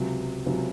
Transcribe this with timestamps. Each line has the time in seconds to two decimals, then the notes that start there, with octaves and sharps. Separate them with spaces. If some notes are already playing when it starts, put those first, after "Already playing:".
Already playing: C#2 C3 F#3
0.46 C#2 C3 F#3